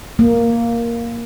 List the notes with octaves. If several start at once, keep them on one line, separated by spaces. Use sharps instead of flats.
A#3